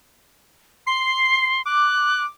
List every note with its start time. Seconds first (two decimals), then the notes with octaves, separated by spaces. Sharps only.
0.87 C6 C7
1.65 D6 F#6